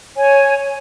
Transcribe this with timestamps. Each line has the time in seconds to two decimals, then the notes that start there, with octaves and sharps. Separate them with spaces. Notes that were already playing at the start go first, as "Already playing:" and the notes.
0.16 C#5 G#5